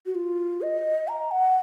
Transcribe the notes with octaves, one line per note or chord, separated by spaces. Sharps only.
F#4
F4
D#5
A#5
F#5